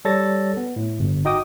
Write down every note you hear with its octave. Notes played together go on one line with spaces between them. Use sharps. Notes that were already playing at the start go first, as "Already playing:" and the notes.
G3 A4 C#5 A6 A#6
B3
A2
G1
D#4 F#4 D#5 G5 D6 D#6